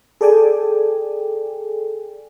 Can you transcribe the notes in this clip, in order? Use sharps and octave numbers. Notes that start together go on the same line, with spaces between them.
G#4 A4 D5 G5 G#5